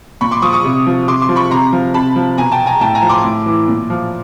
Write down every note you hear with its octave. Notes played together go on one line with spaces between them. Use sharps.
A#2 B5 C#6
C6 D6
F3 C#6 D#6
C#6 D#6
C3
F3
C3 C6 D6
C6 D6
F3
B5 C#6
C3 A#5 C6
F3
C3 A5 B5
F3
B2 G#5 A#5
G5 A5
G#5 A#5
A2 G5 A5
G#5 A#5
F3
C6 D6
A2
E3
A#2
F3